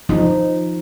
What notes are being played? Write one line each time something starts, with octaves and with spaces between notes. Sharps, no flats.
F3 D#4